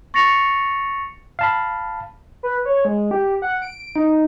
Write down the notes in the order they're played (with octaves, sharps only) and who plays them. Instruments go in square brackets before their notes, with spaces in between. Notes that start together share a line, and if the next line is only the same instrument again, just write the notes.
[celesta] C#6 A6 A#6 C7 C#7 F7
[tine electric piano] F5 A5 B5
[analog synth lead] B4
C#5
G#3
G4
F#5
D7
D#4